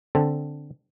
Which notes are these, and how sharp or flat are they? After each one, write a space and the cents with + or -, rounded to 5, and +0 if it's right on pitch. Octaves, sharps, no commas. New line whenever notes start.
D3 +0 C4 +0 A4 +0